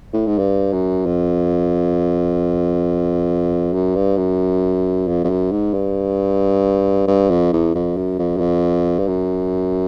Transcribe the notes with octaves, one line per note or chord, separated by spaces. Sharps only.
A2
G#2
G2
F#2
F2
F#2
G2
F#2
F2
F2
F#2
G#2
G2
G2
F2
E2
F2
F#2
F2
F#2
F2
G2
F#2